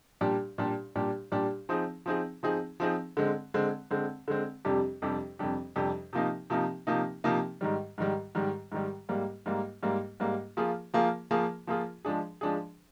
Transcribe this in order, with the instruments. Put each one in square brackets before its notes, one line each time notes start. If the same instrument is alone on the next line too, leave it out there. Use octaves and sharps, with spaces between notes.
[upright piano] A#2 G3 D4 G4
A#2 G3 D4 G4
A#2 G3 D4 G4
A#2 G3 D4 G4
F3 C4 D#4 G#4
F3 C4 D#4 G#4
F3 C4 D#4 G#4
F3 C4 D#4 G#4
D3 G#3 C4
D3 G#3 C4
D3 G#3 C4
D3 G#3 C4
F2 C3 G3 D4 G4
F2 C3 G3 D4 G4
F2 C3 G3 D4 G4
F2 C3 G3 D4 G4
C3 F3 A#3 D#4
C3 F3 A#3 D#4
C3 F3 A#3 D#4
C3 F3 A#3 D#4
G#2 D#3 G3
G#2 D#3 G3
G#2 D#3 G3
G#2 D#3 G3
G#2 G3 A#3
G#2 G3 A#3
G#2 G3 A#3
G#2 G3 A#3
F3 A#3 F4 G#4
F3 A#3 F4 G#4
F3 A#3 F4 G#4
F3 A#3 F4 G#4
F3 G#3 D4 G#4
F3 G#3 D4 G#4